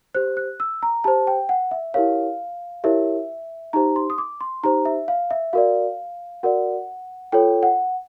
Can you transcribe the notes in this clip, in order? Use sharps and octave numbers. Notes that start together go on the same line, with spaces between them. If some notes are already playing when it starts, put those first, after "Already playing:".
G4 C5 F#6
F#6
E6
A#5
G4 C5 A5
G5
F#5
E5
E4 G4 A#4 C#5 F5
E4 G4 A#4 C#5 E5
D#4 G4 C5 A#5
C6
D#6
D6
C6
D#4 G4 C5 A#5
E5
F5
E5
F#4 A#4 D5 F5
F#4 A#4 D5 F#5
F4 A4 C#5 G5
F#5